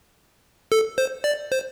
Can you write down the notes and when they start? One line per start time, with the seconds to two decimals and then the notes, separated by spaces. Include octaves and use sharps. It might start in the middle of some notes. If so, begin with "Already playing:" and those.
0.72 A4
0.98 C5
1.24 D5
1.52 C5